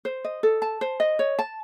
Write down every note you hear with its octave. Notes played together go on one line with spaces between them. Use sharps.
C5
D#5
A4
A5
C5
D#5
C#5
A5